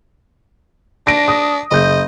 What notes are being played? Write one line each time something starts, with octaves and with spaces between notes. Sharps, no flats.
D4 A#6 D7
D#6
F#1 D#5 G6